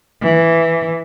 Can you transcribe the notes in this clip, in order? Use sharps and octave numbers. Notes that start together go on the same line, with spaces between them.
E3